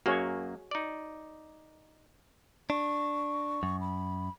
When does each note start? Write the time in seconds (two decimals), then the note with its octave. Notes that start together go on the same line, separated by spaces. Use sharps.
0.06 F#2 A#3 F#4 G#4 C#5
0.71 D#4 D5
2.70 D4 C#6
3.63 F#2
3.81 B5